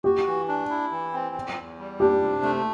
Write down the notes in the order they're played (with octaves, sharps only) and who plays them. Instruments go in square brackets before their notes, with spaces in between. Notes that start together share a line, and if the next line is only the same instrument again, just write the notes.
[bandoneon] F#4 [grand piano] G4
[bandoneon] E3
D4
E4
E3
C4
E2
E2
G3
[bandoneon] D4 [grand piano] G4
[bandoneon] C3
A3